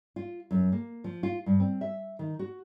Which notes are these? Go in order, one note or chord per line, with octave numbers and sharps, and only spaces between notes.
F4
F#2
A#3
F3
F4
G2
C4
E5
D#3
F#4